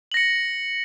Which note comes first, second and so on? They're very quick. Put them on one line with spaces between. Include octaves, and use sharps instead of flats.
F#7 A#6 C#7